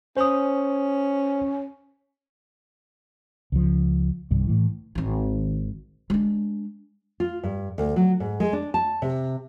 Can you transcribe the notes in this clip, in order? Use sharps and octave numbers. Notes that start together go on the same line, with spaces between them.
C#4 C5 D#6
C#2 F3
C2 G2 D#3
A2 E3
G#1 D#3
G#3 D4
F4
G2
D2
F#3
G#2
G#3
D4
A5
C3